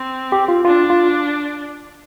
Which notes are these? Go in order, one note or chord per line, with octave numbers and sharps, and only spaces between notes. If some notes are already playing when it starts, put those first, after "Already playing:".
Already playing: C4
G4
F4
D4 F4
F4